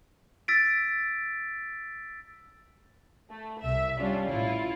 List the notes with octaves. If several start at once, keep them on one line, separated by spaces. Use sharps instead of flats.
E6 A6 B6 D7
A3
C2 E5
G3 C#4 D4 F4
A1 E4 F4